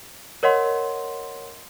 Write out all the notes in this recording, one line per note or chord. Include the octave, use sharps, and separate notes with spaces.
A#4 C#5 D#5 F#5 C6